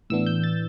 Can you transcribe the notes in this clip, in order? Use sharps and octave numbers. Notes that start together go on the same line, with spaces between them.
A2 E3 B3 D4 E6
G6
A6